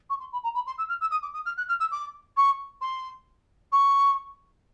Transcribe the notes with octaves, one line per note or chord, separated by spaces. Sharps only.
C#6
C6
B5
A#5
B5
C6
E6
F6
E6
D#6
D6
D#6
F6
F#6
F6
E6
D6
C#6
C6
C#6